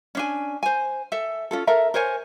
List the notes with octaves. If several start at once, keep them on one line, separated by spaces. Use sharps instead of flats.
C#4 D4 G#5
C5 G#5
A4 E5
C#4 F4 A4
A4 A#4 E5 A#5
A#4 C5 C#5 G#5